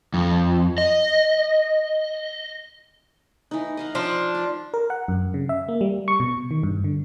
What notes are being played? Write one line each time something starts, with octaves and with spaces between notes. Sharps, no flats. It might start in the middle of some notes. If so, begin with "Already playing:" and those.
F2
D#5
E3 D#4
D#5 F5 F#5
F3 D4
D5
A#4
F#5
F#2
C#3
E5
A#3
G3
C#6
B2
D#3
G2
D3